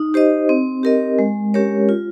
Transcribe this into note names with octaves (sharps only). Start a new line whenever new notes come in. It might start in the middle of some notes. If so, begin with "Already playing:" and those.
Already playing: D#4
G4 C5 D#5
C4
G4 A#4 D#5
G#3
C#4 G4 A#4 C#5
F4